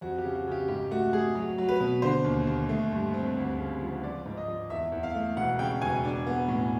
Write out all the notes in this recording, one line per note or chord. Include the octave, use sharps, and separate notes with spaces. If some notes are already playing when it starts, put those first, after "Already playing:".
F2 F#4
G4
C#3
F#4
C#3 G4
G#2 G4
A3 F#4
A3 G#4
F#3
F#3
B4
B2
D3 C5
D#2
D#2
A3
G2
C4
D2
C#3
F3
F3 D5
G#2
D#5
F3
E2 E5
E2
F5
A3
E1 F#5
C#3 G5
E1 G#5
D4
B3
A2